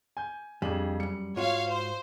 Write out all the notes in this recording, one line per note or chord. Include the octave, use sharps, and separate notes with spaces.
G#5 G6
F2 G3 D4 G#4 F#7
F#2 G3 C#7
G#2 F4 F#4 C#5 F5
C5